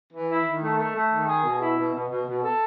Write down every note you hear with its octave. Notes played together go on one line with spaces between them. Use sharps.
E3
E4
D#3
A3
A3
A3
D#3
G#4
B2
E4
B2
B2
B2
B2
A4